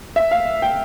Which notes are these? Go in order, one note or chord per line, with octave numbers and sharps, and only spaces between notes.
E5
F5
G5